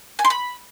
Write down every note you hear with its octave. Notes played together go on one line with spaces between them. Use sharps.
G#5
C6
B5